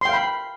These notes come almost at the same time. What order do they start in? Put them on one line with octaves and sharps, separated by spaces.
C6 G5 F5 B5